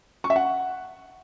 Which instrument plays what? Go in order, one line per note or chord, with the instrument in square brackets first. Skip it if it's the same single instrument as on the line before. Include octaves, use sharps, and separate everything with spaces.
[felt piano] C#6
E5
F#5